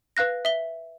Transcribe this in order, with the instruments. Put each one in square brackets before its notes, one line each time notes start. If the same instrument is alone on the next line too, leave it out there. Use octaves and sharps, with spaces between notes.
[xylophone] B4 F5 F#6 A#6
E5 G7